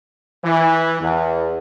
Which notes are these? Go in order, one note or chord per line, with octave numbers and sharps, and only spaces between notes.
E3
E2